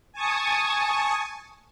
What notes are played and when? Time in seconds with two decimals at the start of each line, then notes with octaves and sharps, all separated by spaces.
0.12 G#5 A5 C#6 D#6